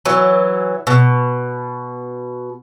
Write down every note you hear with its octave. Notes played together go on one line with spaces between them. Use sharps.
E3 F#3
B2